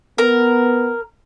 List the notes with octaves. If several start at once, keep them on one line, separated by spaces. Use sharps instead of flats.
B3 A#4